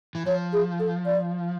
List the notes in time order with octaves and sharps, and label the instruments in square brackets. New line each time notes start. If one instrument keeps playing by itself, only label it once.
[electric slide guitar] E3
[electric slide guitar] F3 [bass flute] C#5
[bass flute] G#4
A4
D5